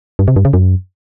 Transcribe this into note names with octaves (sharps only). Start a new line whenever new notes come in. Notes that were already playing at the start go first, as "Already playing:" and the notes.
G2
C3
G2
C#3
F#2